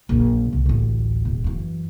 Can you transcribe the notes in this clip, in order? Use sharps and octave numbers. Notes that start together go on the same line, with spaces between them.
A#1 F#2
C2 C3
A1 D2
E1
F#2 E3